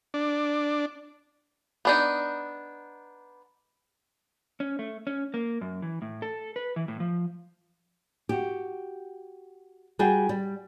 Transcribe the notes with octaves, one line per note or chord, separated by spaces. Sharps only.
D4
B3 D4 D#4
C#4
A3
C#4
A#3
F#2
E3
A2
A4
B4
E3
A2
F3
F#4 G4
G3 F#4 G#4 G5
G3